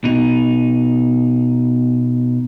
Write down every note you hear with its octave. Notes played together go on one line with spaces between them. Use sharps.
B2 D#4